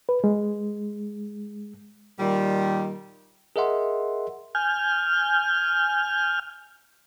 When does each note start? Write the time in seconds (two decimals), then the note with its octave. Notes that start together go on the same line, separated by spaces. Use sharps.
0.09 B4
0.24 G#3
2.19 A#2 D#3 G3
3.56 G#4 A#4 D#5 E5 F#5 C6
4.55 G#5 F6 G6